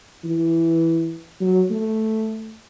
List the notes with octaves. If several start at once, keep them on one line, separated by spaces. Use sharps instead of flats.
E3
F#3
A3